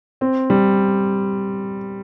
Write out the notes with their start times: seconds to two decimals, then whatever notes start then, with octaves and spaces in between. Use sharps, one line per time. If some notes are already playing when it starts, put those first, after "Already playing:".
0.21 C4
0.50 G3